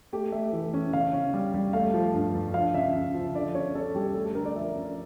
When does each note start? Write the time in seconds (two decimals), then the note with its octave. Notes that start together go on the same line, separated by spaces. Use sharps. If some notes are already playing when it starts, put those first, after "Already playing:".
0.13 A3 G4
0.32 A3 E5
0.53 E3
0.74 C#4
0.93 C#3 F5
1.13 C#4
1.33 G3
1.54 G3
1.73 A3 F5
1.94 F3
2.14 G2
2.35 G2
2.54 F3 F5
2.74 C#3 E5
2.95 C#3
3.14 F3
3.35 D3 D5
3.55 C#4 C#5
3.75 C#4 A4
3.95 G3 G4
4.15 A3 A4
4.26 A4
4.35 D3 A#4
4.45 D5
4.56 F3 E5
4.76 C#4